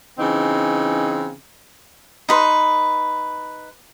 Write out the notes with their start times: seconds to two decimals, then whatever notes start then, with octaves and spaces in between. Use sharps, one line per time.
0.19 C#3 E3 C4 D#4
2.29 D#4 B4 C6